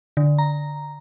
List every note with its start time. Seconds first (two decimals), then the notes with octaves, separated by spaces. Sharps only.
0.17 D3
0.38 A#5